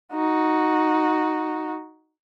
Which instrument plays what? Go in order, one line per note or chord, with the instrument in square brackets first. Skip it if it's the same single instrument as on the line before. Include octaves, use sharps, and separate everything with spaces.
[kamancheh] D#4 F#4